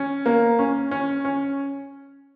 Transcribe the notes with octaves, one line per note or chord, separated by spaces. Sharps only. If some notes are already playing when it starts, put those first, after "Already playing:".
Already playing: C#4
A#3
C#4
C#4
C#4